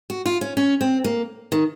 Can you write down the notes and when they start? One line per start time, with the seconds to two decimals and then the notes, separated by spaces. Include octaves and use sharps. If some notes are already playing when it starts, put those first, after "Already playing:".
0.10 F#4
0.26 F4
0.41 C#4
0.57 C#4
0.81 C4
1.04 A#3
1.52 D#3